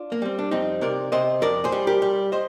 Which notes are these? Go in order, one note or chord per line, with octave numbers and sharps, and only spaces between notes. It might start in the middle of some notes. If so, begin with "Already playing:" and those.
Already playing: D4 F4
A#3
G3 C4
D4
F2 C4 D#4
C3 A#4 D5
C3 C5 D#5
F2 A#4 D5
G#4 C5
G3
G4 A#4
G3
C5 D#5